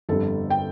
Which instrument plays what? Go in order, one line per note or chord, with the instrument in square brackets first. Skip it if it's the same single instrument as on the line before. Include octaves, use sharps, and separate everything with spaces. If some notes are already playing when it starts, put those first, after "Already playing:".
[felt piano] G1 F2 D3 G3 A4
G5